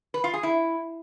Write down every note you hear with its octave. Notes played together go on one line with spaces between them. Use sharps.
B4
F4
G#4
E4